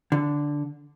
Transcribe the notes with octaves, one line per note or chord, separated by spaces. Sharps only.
D3